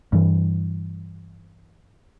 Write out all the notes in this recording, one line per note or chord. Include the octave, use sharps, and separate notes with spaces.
G2 E3